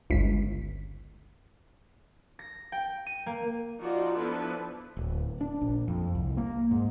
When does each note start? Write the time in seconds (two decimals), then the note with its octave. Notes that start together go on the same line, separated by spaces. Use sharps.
0.10 G1 C#2 B6
2.39 A#6
2.72 G5
3.07 D#7
3.26 A#3
3.78 F3 D#4 F4 F#4 D5
4.15 F3 B3 D4 E4 A4 B4
4.97 D1
5.41 D4
5.61 A#1
5.88 F2
6.15 C2
6.37 A#3
6.71 G#2